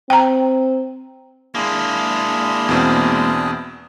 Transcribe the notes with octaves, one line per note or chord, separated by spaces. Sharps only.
C4 G5 A#5
G#3 A#3 D4 E4 G#4
E2 B2 C4